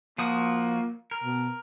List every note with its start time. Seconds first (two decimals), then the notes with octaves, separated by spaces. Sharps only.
0.18 F3 A#3 F#4 D#6
1.11 A#4
1.24 B2